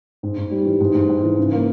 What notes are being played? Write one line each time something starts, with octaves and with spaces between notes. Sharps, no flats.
G#2
G#2
G3
E3
G#2
G#2
G#2
E3
C#3
A#3